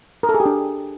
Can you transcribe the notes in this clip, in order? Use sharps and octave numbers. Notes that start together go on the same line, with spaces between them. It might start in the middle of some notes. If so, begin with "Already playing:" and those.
A#4
A4
G#4
G4
D4